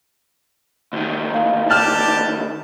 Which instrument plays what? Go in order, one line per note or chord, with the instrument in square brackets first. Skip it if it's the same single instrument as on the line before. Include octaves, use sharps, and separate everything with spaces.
[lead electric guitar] D2 D#3
[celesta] F5
[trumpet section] G4 D5 A5 [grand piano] F6 F#6 [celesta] A6 E7